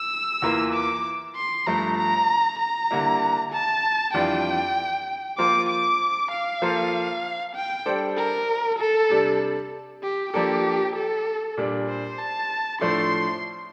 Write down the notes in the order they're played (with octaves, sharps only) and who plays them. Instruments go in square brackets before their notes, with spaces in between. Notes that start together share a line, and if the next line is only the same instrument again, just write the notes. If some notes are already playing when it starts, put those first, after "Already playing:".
Already playing: [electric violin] E6
[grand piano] E2 E3 A#3 F4
[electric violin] D6
C6
[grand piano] G2 F3 A3 [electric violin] A#5
[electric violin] A#5
A#5
[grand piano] D3 G3 A#3 E4
[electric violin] A5
[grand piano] F2 E3 G3 D4 F4 [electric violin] G5
[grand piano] F3 A#3 F4 C5 [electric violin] D6
[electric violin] D6
F5
[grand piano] F3 A#3 F4 A4 C5
[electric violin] G5
[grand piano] G3 D4 A4 C5
[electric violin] A#4
A4
[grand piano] C3 G3 D4
[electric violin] G4
[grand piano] F3 A#3 D4 A4 [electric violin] G4
[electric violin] A4
[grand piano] A#2 G3 D4
[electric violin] C5
A5
[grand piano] A2 F3 A3 D4 A4 [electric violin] C6